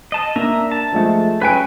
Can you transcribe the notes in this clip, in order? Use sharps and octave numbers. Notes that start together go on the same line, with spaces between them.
D#5 A5
A#3 D4 E5 A#5
A5
F3 G#3 A3
F#3 C#4 B4 G5 G#5 D7